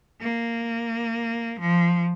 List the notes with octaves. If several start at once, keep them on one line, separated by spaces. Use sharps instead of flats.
A#3
F3